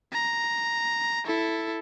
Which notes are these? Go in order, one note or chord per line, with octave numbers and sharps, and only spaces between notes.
A#5
E4 A4